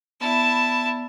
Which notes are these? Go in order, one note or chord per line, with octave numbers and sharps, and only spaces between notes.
B3 E4 D5 A5 B5